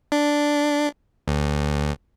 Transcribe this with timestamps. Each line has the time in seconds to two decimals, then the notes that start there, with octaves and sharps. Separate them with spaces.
0.12 D4
1.28 D2